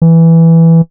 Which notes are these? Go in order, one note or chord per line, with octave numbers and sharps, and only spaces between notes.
E3